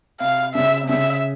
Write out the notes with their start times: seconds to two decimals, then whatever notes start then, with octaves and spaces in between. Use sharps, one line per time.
0.20 C3 F5
0.54 C#3 E5
0.83 C3
0.89 C#3 E5